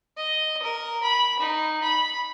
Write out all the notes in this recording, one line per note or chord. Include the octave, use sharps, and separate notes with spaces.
D#5
A#4
B5
D#4
B5